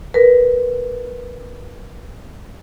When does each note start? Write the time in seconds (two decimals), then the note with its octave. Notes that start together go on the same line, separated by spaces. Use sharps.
0.14 A#4 B4